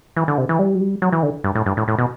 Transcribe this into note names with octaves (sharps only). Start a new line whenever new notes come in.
E3
D3
C3
E3
G3
F#3
G3
F#3
E3
D3
G2
A2
G2
A2
A2
B2